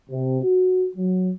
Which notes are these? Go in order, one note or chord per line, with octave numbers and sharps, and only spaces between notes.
C3
F#4
F#3